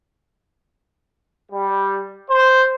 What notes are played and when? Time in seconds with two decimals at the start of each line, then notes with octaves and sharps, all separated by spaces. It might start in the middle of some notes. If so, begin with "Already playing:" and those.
1.51 G3
2.29 C5